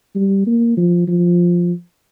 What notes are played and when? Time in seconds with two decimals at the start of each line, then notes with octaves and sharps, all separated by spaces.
0.15 G3
0.47 A#3
0.77 F3
1.07 F3